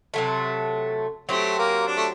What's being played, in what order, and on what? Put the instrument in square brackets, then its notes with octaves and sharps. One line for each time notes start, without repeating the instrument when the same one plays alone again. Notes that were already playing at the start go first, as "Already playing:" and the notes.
[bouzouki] C3 F#3 A3
[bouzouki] F#3 C4 G4 [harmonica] A3
[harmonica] A#3
D4
A3